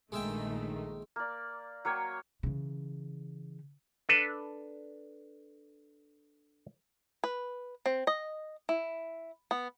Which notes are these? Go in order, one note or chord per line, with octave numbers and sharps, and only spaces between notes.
A#1 D#3 G#3 A3 E5 G5
A#3 D5
F#3 A#3 C#5 G5
C#3 E3
D4 A4 B4
B4
C4
D#5
E4
B3